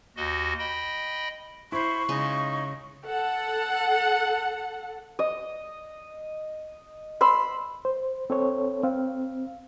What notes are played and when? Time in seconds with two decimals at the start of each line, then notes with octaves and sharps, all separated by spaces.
0.16 D#2 F#4 D#5
0.59 D#5 G5 B5
1.72 E4 C5 B5 C#6
2.09 C#3 G#3 D#4 G#5
3.05 A4 F#5
5.19 D#5
7.21 B5 C6 E6
7.85 C5
8.30 C4 A4 C5 C#5
8.84 C4 F5